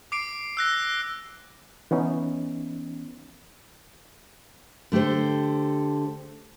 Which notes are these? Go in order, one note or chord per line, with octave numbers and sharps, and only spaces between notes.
D6 C7 D7
E6 F#6 A#6
E3 B3 C#4 D#4
D3 A3 G4 A4 C5